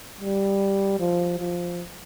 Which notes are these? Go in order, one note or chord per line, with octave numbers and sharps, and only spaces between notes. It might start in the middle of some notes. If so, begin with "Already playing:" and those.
G3
F3
F3